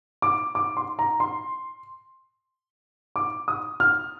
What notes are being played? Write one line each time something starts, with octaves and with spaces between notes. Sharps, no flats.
D6
D6
C6
A#5
C6
D6
D#6
F6